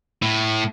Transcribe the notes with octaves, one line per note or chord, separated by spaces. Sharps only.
A2